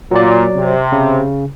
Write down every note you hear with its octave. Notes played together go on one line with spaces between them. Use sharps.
A#2 F#3 D5
C3
C#3